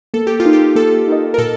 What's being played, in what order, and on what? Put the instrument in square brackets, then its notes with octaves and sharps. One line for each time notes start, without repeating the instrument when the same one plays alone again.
[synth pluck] A#3 [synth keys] A4
[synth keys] G4
F4
[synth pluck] D#4 A#4 D#5
[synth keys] G4
[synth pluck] A#3 [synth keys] A4
[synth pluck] D#4 A#4 D#5
[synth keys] A#4
[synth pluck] A#2 [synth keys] A4